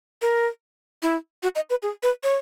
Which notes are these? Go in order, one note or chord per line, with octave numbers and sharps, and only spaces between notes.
A#4
E4
F#4
D#5
B4
G#4
B4
C#5